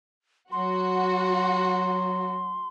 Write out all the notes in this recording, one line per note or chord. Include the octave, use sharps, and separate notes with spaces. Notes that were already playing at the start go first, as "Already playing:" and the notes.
F#3 F#4 C6